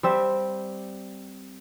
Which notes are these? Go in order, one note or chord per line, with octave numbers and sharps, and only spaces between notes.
G3 C4 E5